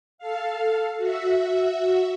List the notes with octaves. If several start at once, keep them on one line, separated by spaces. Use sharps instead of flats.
A4 F5
F#4 E5